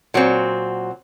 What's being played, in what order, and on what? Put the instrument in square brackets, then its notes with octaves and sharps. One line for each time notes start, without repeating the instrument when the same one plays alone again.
[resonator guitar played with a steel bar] A#2 F#3 C4